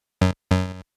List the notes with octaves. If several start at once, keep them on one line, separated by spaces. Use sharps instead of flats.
F#2
F#2